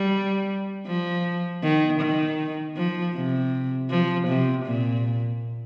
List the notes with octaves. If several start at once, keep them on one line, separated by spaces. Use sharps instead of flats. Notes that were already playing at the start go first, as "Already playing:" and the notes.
Already playing: G3
F3
D#3
D#3
F3
C3
F3
C3
A#2